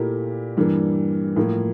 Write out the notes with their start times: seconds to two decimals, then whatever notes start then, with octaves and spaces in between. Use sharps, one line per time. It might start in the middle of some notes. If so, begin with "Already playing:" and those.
Already playing: A#2 A3 E4 G4 A#4
0.57 G2 E3 G3 A#3
1.36 A2 F3 A#3 F4